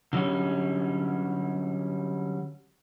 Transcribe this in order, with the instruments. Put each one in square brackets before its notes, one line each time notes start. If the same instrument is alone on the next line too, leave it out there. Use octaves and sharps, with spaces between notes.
[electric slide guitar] D3 F#3 G3 C#4